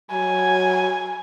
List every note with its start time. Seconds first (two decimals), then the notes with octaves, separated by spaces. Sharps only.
0.11 F#3 G#5